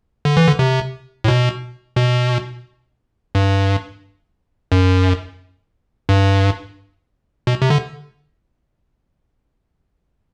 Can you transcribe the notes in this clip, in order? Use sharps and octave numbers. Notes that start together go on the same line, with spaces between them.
D3
E3
D3
C3
A2
B2
B2
G2
F#2
G2
B2
C3
D3